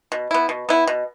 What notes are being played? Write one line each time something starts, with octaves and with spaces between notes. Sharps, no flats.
B2
B3 E4
B2
B3 E4
B2